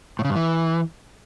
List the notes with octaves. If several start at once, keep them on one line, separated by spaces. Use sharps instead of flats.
A2
C#3
G2
E3